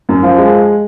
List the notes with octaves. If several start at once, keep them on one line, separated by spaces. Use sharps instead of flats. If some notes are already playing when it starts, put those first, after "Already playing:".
F#2
F3
G#3